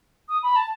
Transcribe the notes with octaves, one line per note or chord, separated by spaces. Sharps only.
D#6
B5
A5